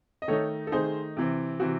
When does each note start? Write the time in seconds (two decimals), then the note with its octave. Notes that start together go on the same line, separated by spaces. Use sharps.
0.22 D#5
0.28 D#3 A3 D#4 A4 C#5
0.67 A4
0.72 D#3 A3 D#4 G#4 C5
1.17 C3 E3 C4
1.60 C3 E3 C4 F#4